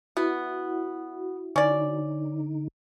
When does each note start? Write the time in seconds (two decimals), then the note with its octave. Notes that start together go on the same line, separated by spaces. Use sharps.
0.17 B3 E4 F#4
1.56 D3 C#4 D#4 D5